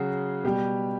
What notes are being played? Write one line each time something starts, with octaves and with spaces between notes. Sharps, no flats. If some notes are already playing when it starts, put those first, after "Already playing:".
Already playing: C#3 F#3 F#4 G#4
B2 G3 G4